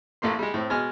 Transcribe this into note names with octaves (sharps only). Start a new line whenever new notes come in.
A1 A3 A#3 C6
G3 G#3
A2 C4
B2 G#3 G#5 F6